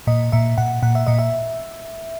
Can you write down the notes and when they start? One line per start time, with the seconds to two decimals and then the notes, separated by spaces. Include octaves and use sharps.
0.07 A#2 D#5
0.32 A#2 E5
0.58 A#2 F#5
0.83 A#2 F#5
0.95 E5
1.07 A#2 D#5
1.19 E5